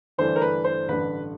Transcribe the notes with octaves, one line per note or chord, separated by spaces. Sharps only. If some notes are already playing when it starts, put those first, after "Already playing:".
G1 G2 E3 A3 D4 C5
A#4
B4
C5
A1 G2 D3 B4